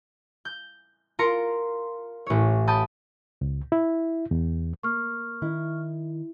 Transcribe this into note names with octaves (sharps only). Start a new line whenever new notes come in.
G6
F4 A#4 A#5 C6 C#7
A1 C#5
G5 A5 B5 D#6
C#2
E4
E2
A#3 C#6 F6
D#3 E4